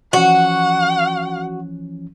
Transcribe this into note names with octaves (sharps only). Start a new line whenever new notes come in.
E3 F3 C#4 F#4 F#5